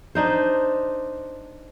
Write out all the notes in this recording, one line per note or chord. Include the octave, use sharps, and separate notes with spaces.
D4 D#4 C5